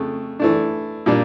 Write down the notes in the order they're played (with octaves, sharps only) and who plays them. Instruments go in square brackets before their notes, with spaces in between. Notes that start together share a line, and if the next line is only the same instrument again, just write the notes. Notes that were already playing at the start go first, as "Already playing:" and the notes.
Already playing: [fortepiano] F2 C#3 A3
E3 A3 D4
A#2 G3 A#3 D4